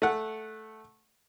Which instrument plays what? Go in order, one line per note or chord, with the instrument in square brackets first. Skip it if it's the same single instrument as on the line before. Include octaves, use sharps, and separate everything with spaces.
[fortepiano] A3 F#5